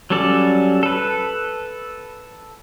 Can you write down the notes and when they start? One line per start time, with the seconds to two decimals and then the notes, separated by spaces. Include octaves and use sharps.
0.10 F#3 G3 C#4 A4 D5
0.83 A4 B4